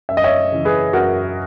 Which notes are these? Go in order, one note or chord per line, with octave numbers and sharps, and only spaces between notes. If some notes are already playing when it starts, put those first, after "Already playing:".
F#2 E5
D#5
C#5 E5
C#3 E3
G#4 B4
F#2 F#4 A#4